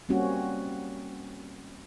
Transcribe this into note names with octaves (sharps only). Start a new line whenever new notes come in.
G3 A#3 C4 C#4 F#4